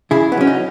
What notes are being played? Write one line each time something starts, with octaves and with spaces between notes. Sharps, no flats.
C#3 E4 G#4
B3
F#3 C#4
D#4